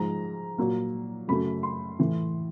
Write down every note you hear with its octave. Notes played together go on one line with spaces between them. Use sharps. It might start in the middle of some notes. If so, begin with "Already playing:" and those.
Already playing: G#2 F3 G#3 A#5
A#2 F#3 A#3
F#2 C#3 F#3 A3 B5
C6
A2 E3 A3